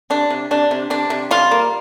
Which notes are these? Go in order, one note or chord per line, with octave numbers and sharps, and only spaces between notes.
C3 D4
C3
C3 D4
C3
C3 D4
C3
G3 F4
A#3